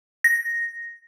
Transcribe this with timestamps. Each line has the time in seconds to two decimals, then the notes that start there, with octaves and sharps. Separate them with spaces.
0.24 A#6